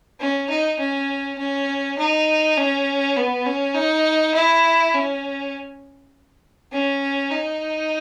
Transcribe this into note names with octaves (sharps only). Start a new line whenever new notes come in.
C#4
D#4
C#4
C#4
D#4
C#4
B3
C#4
D#4
E4
C#4
C#4
D#4